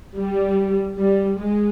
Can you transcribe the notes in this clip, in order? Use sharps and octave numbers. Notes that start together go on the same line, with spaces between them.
G3
G3
G#3